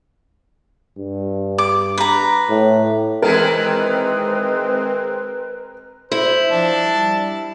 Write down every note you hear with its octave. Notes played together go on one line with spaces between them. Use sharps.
G2
D6
B4 A#5
A2
D#3 E3 G#3 C4 A#4 B4
E4 C5
F3 D4 A5
G3